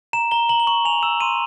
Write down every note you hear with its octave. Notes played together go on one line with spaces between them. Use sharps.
A#5 E7
A#5 G7
A#5 F#7
G7
C#6 F#7
G#5 F7
E6 E7
C6 D#7